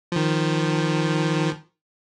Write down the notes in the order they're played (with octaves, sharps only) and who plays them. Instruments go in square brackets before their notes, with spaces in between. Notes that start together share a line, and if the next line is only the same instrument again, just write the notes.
[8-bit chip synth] D#3 F3